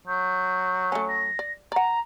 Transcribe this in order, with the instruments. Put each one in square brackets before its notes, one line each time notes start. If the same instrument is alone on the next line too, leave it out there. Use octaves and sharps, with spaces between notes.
[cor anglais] F#3 [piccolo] G6
[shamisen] A3 C#4 [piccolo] C#7
[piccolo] A#6
[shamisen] D5
[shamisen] D5 F#5 [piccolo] A#5